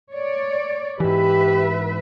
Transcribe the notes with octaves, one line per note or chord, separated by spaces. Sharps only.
C#5 D5
G#2 E3 G4 B4 E5